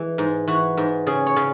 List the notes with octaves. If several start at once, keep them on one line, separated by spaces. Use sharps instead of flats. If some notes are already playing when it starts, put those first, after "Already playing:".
Already playing: E3 G#3
G#2
E3 F#4
G#2
C#3 G#4
C#5
C#3